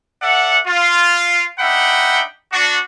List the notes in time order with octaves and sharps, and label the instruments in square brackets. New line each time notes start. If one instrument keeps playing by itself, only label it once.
[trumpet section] A4 D5 E5 F#5
F4
D4 D#4 E5 F#5 G5 B5
D4 F#4